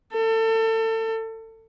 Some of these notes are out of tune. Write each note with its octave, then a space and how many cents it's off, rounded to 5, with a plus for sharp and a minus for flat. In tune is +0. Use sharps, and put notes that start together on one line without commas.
A4 +30